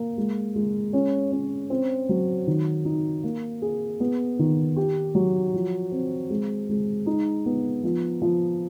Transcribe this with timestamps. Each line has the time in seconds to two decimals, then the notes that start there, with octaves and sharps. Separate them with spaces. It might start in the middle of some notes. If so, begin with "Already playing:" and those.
Already playing: A#3
0.17 G#3
0.55 G#3
0.93 C#4
1.32 C#4
1.70 C4
2.09 F#3
2.47 D#3
2.85 D#4
3.24 A#3
3.62 G#4
4.00 B3
4.39 D#3
4.76 G4
5.15 F#3
5.54 F3
5.92 C4
6.30 G#3
6.69 G#3
7.06 D#4
7.46 B3
7.84 F3
8.22 F3